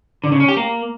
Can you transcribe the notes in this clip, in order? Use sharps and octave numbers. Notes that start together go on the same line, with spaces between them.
D3
C#3
C#4
G4
A#3